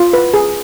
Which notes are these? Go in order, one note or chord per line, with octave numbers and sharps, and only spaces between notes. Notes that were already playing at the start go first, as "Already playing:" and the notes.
Already playing: F4
B4
G#4